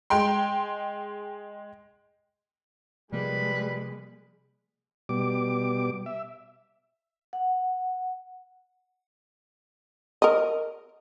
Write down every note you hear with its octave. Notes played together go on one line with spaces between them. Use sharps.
G#3 G5 C6
C3 F3 G3 G#3 A#3 B4
B2 G3 D6
E5
F#5
A#4 D#5